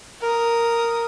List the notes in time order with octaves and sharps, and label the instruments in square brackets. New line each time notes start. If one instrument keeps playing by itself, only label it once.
[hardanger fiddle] A#4 D#6